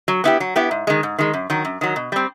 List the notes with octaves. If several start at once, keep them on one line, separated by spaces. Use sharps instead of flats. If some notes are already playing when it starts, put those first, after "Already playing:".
F#3
B3 E4 G4
F#3
B3 E4 G4
G#2
D#3 G#3
G#2
D#3 G#3
F#2
D#3 F#3
F#2
D#3 F#3
B2
G3 C4